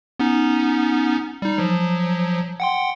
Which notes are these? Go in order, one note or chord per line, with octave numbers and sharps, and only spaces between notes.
B3 C#4 D#4
G3 D#4
F3 F#3
F#5 G5 C6